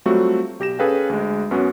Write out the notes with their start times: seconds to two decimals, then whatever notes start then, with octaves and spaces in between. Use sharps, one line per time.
0.05 F#3 G3 A3 C4 F4 F#4
0.59 B1 G4 A#6 E7
0.79 C#4 G#4 A4 B4 F5 G5
1.09 D2 G#3
1.51 F#2 B3 C#4 F#4